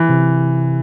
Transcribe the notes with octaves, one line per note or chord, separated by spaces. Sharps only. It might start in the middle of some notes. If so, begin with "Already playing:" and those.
Already playing: E3
C3